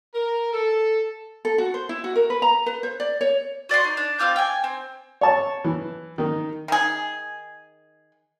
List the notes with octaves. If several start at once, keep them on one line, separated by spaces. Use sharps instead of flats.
A#4
A4
A4
F#4
C5
E4
F#4
A#4
B4
A#5
B4
C5
D5
C#5
F#4 D5 F#5 C6
D#4
D4
C4 F4 D6 G6
G5 G#5
C4
C#5 A5
E3
D#3 D#4
D#3 G#4